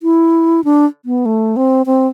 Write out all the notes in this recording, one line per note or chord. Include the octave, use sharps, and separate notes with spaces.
E4
D4
B3
A3
C4
C4